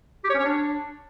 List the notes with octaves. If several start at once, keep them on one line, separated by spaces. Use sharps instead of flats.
G4
C#5
C#4
C#5
D4